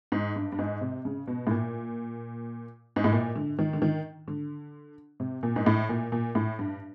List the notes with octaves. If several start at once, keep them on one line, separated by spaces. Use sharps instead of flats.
G#2
G2
G2
G#2
C3
C#3
B2
A2
A#2
G#2
A2
A#2
D3
D#3
D3
D#3
D3
C3
A#2
G#2
A2
A#2
A#2
A2
G2